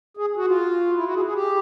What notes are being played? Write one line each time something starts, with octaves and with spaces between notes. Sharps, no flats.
G#4
F#4
F4
E4
F#4
G#4
G#4
G4